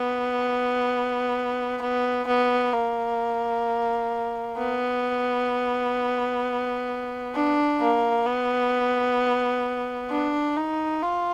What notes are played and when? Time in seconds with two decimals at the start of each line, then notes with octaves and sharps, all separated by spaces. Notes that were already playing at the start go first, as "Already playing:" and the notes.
Already playing: B3
1.81 B3
2.27 B3
2.73 A#3
4.58 B3
7.35 D4
7.80 A#3
8.26 B3
10.10 D4
10.57 D#4
11.03 F4